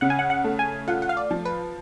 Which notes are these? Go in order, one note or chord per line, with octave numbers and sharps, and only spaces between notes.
C#3 F#5
G#5
F#5
F#5
A3
G#5
F4 F#5
F#5
F5
D5
F3
B4